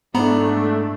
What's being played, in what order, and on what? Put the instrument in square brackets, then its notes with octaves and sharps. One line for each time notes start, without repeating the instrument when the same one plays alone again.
[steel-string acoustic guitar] G#2 [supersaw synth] A3 [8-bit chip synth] B3 A#5 B5 [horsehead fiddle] D4 E4